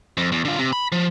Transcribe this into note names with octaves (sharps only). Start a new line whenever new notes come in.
F2
E2
D3 F4
C3
B5
F3